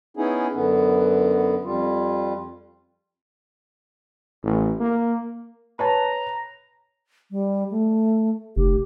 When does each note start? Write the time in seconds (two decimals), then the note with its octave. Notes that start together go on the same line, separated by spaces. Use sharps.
0.17 B3 C#4 D#4 E4 G#4
0.55 F#2 D3 B3
1.64 F2 G3 F4
4.43 A1
4.80 A#3
5.79 B4 C#5 A5 A#5
7.31 G3
7.71 A3
8.56 F1 G4